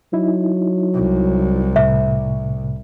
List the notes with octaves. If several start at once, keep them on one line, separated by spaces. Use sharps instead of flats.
F#3 D#4 E4
C2
A2 C3 E5